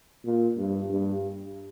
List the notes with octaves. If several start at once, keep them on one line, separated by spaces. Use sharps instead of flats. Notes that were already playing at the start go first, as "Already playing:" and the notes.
A#2
G2
G2